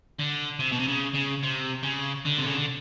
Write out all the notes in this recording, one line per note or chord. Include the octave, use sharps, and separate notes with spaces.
D3
C3
B2
C3
C#3
C#3
C3
C#3
D3
C3
C#3
D3